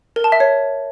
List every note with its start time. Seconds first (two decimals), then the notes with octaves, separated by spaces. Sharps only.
0.16 A#4
0.24 A5
0.32 E5
0.40 C#5